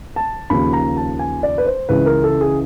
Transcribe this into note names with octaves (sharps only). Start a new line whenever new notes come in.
A5
D#2 C#3 F3 B5
A#5
A5
G#5
D5
B4
C5
C#2 C#3 E3 B4
A#4
A4
G#4